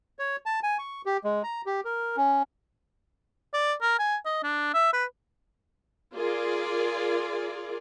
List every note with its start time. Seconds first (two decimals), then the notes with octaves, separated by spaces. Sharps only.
0.19 C#5
0.46 A5
0.63 G#5
0.79 C#6
1.06 G4
1.24 G#3
1.43 A#5
1.66 G4
1.85 A#4
2.17 C#4
3.54 D5
3.82 A#4
3.99 G#5
4.25 D#5
4.43 D4
4.74 E5
4.93 B4
6.15 F4 G#4 A#4 D5